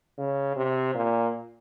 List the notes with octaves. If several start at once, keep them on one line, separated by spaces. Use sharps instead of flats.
C#3
C3
A#2